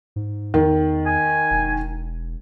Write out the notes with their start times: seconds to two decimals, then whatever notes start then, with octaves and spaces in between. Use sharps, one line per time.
0.16 G#2
0.54 E2 D#3
1.06 G#5
1.51 E1